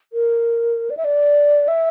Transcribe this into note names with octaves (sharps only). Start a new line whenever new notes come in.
A#4
D5
E5
D5
E5